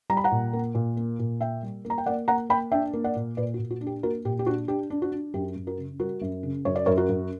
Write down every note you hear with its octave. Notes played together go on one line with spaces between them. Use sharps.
G3 A#5
B5
F#5 A#5
A#2
A#3
A#2
A#3
A#2
A#3 E5 G5
G3
A#3
A#5
G5
A#3 D5 F#5
A#3 F#5 A#5
A#3 G5 B5
D4 E5 G5
A#3
D5 F#5
A#2
A#2 B4 D5
F#4
A#2
F#4
D4
G4
A#3 F#4 A#4
A#2 G4
G4
D4 F#4
D4 G4
D4
F#4
D4
F#2 G4
F#2
F#4 A#4
C#3
G3 F#4 A#4
F#2
C#3
F#2 C#5
D5
F#2 A#4 C#5
F#4 A#4
F#2